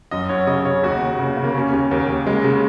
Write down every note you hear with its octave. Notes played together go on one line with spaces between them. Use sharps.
F#2 D#5
F#2 C#5
C#3 D#5
C#3 C#5
D#2 F#4
D#2
C#3
C#3
A#3
C#3 C#4
D#2
D#2 A#3
D#2
C#3 G#3
C#3